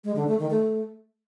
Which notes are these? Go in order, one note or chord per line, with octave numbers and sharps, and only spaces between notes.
G#3
D3
A3
D#3
A3